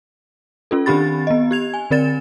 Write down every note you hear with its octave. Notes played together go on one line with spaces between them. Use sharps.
C#4 F4 A4
D#3 C4 D4 G4 B5 A6
B3 D#5
G4 G#6 F7
G#5
D3 C4 A#4 D5 A6 E7